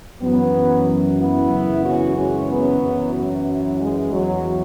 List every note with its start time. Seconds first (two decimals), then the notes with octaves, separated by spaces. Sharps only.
0.21 F#2 E3 F#3 B3
1.19 B3 E4
1.51 F#2 C#3 E3
1.84 C#4 F#4
2.17 G#3 C#4
2.49 F#3 B3
2.81 F#2 E3
3.14 F#3
3.79 G#3
4.11 E2 E3 F#3